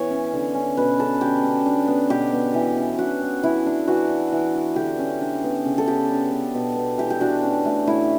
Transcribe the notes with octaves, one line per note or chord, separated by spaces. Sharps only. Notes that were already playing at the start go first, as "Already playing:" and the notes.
Already playing: E3 B3 C#5
C#4
D3
C#4
B2 B4
C#4 A4
D3 G4
C#4
D4
B3
B2 G4
B3
E3
C#4
D4 F#4
B3
E3 E4
D4
E3 F#4
D4
E3
D4
D3 G4
C#4
D4
B3
C#3
A4
B3 G4
D4
B3
B2
B3
E3 G4
G4
D4 F#4
C#4
A3
A2 E4